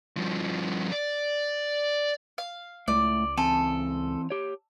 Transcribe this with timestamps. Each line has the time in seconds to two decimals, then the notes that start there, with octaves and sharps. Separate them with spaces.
0.17 G2 F3
0.92 D5
2.38 F5
2.88 C#2 A2 A3 D5
3.37 E3 C4 A4 G#5
4.30 G4 C#5